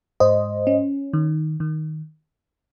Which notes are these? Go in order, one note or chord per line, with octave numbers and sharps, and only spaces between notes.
G#2 C5 D#5
C#4
D#3
D#3